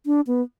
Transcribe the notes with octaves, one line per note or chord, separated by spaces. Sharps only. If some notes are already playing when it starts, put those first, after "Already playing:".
D4
B3